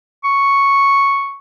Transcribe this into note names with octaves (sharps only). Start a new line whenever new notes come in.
C#6